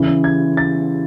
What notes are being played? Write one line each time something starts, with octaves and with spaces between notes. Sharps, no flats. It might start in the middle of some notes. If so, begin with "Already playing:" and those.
Already playing: C#3 E3
G#6
A6